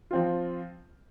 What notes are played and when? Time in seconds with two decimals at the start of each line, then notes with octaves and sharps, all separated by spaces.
0.11 F3 C4 F4